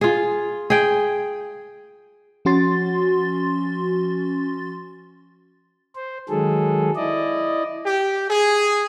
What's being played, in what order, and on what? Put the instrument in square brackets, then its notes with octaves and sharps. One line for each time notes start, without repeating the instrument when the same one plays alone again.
[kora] F4 G#4
G#4 G5
[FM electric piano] F3 C#4 F#4 C6 A6
[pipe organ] C5
D#3 F#3 G#3 G#4 A4
E4 D5 D#5
[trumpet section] G4
G#4